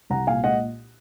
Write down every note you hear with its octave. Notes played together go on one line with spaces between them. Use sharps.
C2 F#5 A#5
A#2 F5 G#5
G#3 D#5 F#5